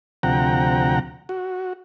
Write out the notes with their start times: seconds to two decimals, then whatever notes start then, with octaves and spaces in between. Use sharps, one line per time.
0.23 D2 C3 F3 F#5 G5 A#5
1.29 F#4